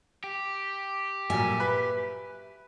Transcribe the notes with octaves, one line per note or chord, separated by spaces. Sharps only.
G4
G2 A#2 F#3 E5 G#5
B4 B6